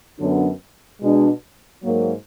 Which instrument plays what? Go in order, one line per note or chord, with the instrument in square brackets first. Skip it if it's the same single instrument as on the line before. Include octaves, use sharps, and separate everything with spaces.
[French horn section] F#2 D3 F#3 B3 D4
B2 G#3 D4
G#2 F#3 A#3